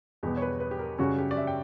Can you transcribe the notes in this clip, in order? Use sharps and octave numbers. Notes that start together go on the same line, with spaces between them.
E2 B2 G3 B3 G4
C#5
B4
B4
G4
A#4
F#2 C#3 G3 C#4 F#4
G4
D5
E5
G5